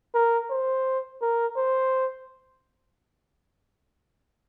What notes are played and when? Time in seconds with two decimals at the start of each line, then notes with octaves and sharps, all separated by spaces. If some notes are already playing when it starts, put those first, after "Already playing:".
0.14 A#4
0.50 C5
1.22 A#4
1.57 C5